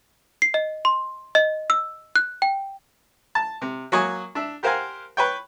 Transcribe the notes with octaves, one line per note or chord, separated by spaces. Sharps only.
C7
D#5
C6
D#5
E6
F#6
G5
A5
C3
F#3 A#3 C#5 G#5 D#6
D4 E5
G4 A#4 C5 F5 F#5 G#5
B4 C#5 G5